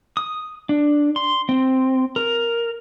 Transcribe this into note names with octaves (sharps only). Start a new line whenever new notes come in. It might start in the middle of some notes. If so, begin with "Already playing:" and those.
D#6
D4
C6
C4
A#4